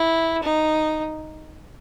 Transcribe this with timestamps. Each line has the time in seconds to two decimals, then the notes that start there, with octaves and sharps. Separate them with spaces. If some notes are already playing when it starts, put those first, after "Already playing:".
Already playing: E4
0.43 D#4